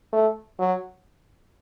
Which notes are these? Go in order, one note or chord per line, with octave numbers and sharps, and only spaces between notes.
A3
F#3